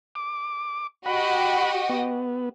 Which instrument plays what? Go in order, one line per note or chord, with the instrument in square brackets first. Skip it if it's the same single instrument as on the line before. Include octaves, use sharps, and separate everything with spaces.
[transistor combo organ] D6
[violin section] F#4 G4 D#5 [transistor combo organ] F#5 B5
[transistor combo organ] B3